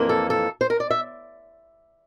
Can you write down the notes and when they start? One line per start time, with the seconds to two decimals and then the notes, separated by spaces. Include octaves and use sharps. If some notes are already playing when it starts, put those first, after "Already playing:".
Already playing: F2 E3 A#3
0.09 A4
0.30 A4
0.61 C5
0.70 A#4
0.80 D5
0.91 E5